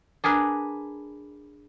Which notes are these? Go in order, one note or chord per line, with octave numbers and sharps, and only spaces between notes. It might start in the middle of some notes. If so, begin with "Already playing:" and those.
D4 G#4 A#4 B4